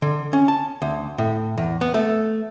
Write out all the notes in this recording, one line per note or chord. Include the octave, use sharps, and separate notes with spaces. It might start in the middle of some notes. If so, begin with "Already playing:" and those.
D3
C#4
A5
D2
A2
E2
B3
A3